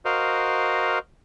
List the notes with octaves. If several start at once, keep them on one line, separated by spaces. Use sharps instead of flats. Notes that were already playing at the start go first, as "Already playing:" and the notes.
F#4 A#4 C5 D#5 F5